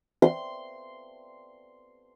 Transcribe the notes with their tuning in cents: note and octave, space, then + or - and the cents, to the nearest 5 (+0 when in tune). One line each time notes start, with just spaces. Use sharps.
C6 -5